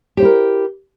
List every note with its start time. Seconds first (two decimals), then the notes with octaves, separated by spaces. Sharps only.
0.17 G4
0.20 C5
0.22 E4
0.25 A#4